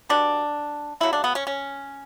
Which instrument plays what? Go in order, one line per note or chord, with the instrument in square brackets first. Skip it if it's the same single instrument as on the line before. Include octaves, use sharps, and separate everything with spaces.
[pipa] B2 G3 B3 D4
C#3 F#3 A3 E4
D4
B3
C#4
C#4